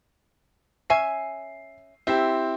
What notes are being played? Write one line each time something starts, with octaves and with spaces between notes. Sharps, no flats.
C#4 E5 G#5 C7
C4 E4 G4 E5